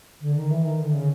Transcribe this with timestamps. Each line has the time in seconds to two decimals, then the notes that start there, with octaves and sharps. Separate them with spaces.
0.20 D3
0.35 D#3
0.50 E3
0.64 D#3
0.78 D3
0.93 C#3